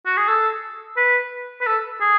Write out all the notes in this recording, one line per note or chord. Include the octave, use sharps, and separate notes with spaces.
F#4
G#4
A4
B4
B4
A4
G#4